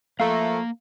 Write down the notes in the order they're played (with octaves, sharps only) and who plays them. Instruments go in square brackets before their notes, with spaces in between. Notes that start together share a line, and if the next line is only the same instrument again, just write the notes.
[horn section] F3 A3 [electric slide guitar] A#3 A#5 [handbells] F5